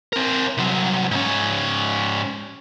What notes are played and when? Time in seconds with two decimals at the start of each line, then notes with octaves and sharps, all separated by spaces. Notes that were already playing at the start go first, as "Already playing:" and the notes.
0.13 C4 A#4
0.58 C2 F#3
1.11 G#2 C#4